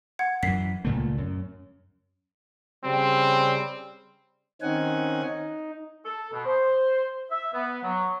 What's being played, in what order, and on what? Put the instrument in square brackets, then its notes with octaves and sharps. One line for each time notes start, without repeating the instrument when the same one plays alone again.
[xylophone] F#5 G#6
[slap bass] F#2 E3 [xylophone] B6 C7
[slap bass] C#2 A#2 A3
F#2
[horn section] C#3 G3 C4
[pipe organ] D#3 C4 C#4 D#4 F#5 G#5
D#4
[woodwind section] A4
B2
C5
E5
B3
F#3